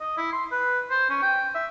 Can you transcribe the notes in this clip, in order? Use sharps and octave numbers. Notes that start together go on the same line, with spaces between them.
D#5
E4
C6
B4
C5
C#4
G5
E5